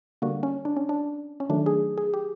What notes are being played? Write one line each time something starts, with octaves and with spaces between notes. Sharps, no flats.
D3 G3 A#3 F#4
C#4
D4
C#4
D4
C#4
D#3 F#3 A3 D4
G#4
G#4
G4